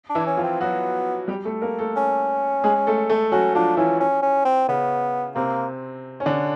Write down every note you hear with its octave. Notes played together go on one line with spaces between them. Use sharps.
D4
E3 E4
C#4
F3 F4
C4
F#3 B3 F#4
G3 G4
A3 A4
A#3 A#4
A3 A4
C#4
G#3 G#4
A3 A4
A3 A4
F#3 C#4 F#4
F3 D4 F4
E3 C#4 E4
C#4
C#4
C4
C#3 B3 C#4
C3 A#3 C4
C#4
D3 D4